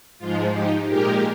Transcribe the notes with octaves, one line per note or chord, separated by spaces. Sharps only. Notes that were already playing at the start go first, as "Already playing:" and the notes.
G#2 F3 G#3 F4
D#4 G4
A#2 G#3 G4 A#4